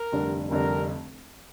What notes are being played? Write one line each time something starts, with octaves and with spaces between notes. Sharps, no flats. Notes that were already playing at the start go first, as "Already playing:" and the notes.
Already playing: A#4
F1 F2 D3 G3 D4
F1 F2 D3 G3 D4 A#4